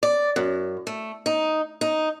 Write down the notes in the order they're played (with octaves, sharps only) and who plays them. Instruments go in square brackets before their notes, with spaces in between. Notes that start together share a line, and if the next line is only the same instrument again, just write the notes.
[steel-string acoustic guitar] D5
F#2
A3
D#4
D#4